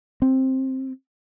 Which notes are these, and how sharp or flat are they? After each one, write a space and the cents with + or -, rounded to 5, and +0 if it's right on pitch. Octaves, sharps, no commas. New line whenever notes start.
C4 +10